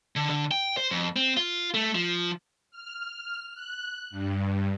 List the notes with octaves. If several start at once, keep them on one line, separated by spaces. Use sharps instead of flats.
D3
D3
G5
C5
F2
C4
F4
A3
F3
F6
F#6
G2